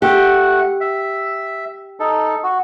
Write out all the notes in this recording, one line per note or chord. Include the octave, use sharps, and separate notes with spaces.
A3 G4 F#5
E5
D#4 A4
F#4